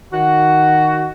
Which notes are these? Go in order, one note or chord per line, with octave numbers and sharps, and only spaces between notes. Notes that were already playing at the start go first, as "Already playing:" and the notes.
D#3 F#4